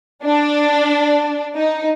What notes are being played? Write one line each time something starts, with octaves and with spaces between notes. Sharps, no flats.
D4
D#4